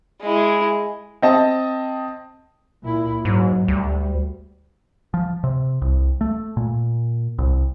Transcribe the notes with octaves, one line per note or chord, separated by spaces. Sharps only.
G#3 E4
C4 D#5 A5
A#2 E4
G#2 F#3
D2 G3
F3
C3
C2
A3
A#2
C2